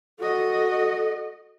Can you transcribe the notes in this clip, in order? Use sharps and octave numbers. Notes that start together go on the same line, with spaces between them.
F#4 A4 D#5